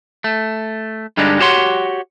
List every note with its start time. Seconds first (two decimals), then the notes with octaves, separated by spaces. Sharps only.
0.24 A3
1.17 G2 D3 G3 G#3 D4 D#4
1.40 F#4 G4 C#5 F#5 C6